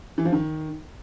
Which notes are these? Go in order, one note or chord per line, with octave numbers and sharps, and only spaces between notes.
E3
F3
D#3